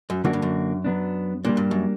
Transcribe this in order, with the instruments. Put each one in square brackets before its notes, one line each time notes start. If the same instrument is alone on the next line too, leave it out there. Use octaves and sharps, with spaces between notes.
[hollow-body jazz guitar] F#2
[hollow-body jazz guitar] F#2 [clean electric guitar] D3 A#3 D4 F#4
[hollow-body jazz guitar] G2
F#2
[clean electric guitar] F#3 B3 D4
[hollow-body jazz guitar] A#2 [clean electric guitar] G3 A#3 D4
[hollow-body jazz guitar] G2
F#2